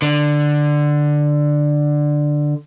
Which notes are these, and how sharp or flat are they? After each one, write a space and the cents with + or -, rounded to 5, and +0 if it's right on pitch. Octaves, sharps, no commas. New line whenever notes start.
D3 +10